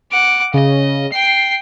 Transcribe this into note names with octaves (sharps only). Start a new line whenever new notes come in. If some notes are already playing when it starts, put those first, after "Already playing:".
F#5 D6
C#3 D#5
G5 C7